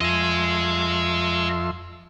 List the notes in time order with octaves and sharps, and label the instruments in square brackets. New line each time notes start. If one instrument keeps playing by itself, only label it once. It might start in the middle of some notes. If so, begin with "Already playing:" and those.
[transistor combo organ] F2 E5 C6 [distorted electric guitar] D#5 G#5